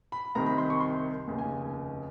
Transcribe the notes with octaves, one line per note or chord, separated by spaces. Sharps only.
B5
C2 C3 D#3 A#5
B5
C6
C#6
C6
F1 D#2 C#3
G#5